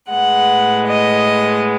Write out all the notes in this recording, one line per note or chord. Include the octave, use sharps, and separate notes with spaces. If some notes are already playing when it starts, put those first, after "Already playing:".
A2 G#3 B3 F#5
D#5